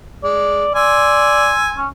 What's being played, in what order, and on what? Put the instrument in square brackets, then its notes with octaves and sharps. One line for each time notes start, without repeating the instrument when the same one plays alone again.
[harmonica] G#3 [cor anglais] D5
[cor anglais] D5 [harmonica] G#5 C6 E6
[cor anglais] C#4